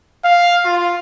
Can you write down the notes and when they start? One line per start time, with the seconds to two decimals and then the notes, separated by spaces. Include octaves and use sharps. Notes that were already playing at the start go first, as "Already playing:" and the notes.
0.25 F5
0.65 F4